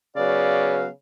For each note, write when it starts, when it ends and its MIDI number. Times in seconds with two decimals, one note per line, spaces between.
0.16 0.90 49
0.16 0.86 54
0.16 0.86 59
0.16 0.80 74
0.16 0.86 77